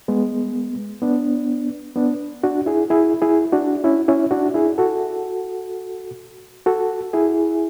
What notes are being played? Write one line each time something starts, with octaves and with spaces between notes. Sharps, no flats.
G#3 B3
B3 D4
B3 D4
D4 F#4
E4 G#4
E4 G#4
E4 G#4
D4 F#4
C#4 E4
C#4 E4
D4 F#4
E4 G#4
F#4 A4
F#4 A4
E4 G#4